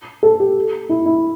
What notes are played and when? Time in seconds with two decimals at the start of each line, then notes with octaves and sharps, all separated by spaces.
0.23 A4
0.40 G4
0.89 E4
1.05 E4